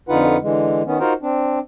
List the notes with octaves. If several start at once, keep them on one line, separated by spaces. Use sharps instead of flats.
F2 D3 D#4 F4 B4 F#5
D3 E3 G#3
D#3 B3 C#4
D#4 F4 F#4 A#4 C5
C4 D4